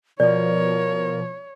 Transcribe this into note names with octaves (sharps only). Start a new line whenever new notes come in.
B2 F3 A#4 C#5 D5